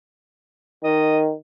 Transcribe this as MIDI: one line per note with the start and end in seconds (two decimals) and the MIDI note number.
0.84 1.33 51
0.84 1.18 75